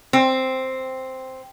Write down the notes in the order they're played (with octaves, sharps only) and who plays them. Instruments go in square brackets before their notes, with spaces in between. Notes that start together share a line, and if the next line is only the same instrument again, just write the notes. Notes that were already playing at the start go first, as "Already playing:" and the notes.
[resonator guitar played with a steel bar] C4